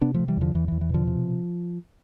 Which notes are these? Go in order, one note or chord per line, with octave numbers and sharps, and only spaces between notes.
C3 B3 D4
F3 A3
C3
E3 G3
E2 D3 F3
E2 E3
E2 E3
E3
B2 D3 F3
C3